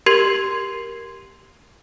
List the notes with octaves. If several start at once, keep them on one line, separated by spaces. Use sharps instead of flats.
G4 A#4 C6 G#6 C7 F#7